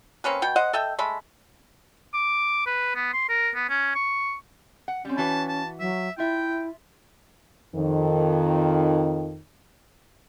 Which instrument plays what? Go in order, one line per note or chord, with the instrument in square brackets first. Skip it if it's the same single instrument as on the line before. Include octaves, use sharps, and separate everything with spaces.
[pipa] A#3 C4 C#4 B4
B2 G5
C5 D#5 F#5
A4 D#5 E5 G5
G#3 A3 B5
[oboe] D6
B4
B3
C6
A#4
B3
C#4
C#6
[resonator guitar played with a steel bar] F#5
[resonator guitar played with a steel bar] G3 C4 [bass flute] C#4
[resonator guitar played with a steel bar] E3 F#4 B4 [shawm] A5
[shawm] A5
[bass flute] F#3 [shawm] E5
[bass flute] E4 [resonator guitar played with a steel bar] F4 E5 [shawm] G5
[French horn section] F2 D#3